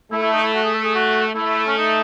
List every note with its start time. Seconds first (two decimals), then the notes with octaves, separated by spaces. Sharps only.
0.12 A3 E4
0.22 E4
0.33 D#4
0.43 E4
0.54 F#4
0.64 G#4
0.74 A4
0.84 G#4
0.95 F#4
1.36 A3 E4
1.67 C#4
1.78 D#4